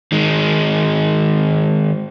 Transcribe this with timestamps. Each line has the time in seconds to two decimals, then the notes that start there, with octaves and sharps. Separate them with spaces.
0.12 D#3 G#3